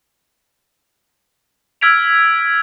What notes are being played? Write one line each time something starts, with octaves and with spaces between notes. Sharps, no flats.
E6 F6 G#6 B6 D7 F7